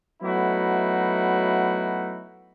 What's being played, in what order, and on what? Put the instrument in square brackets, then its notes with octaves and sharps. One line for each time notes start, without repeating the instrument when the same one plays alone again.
[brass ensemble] F#3 A3 B3 D#4 E4 F#4